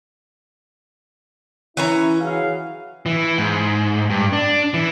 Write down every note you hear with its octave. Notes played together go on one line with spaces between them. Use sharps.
E3 C#4 E4 A#5
F#3 G#4 F5
E3
G#2
G2
D4
E3